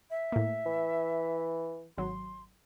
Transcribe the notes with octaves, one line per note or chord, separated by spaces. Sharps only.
E5
A2 A#3
E3
G#1 F#3 C6